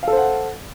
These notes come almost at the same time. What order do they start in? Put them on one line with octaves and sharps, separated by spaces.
F5 A4 C5 F#5